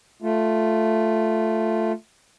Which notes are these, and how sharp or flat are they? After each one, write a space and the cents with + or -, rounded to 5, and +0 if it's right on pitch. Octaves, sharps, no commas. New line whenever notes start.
A3 +0 F4 +0